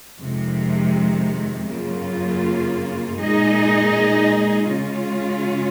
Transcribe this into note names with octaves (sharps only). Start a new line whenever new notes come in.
F2 C3 D#3 G#3
F#2 C#3 F#3 A#3 F4
A#2 G#3 D#4 G#4 D#5
C#3 G#3 C#4 F4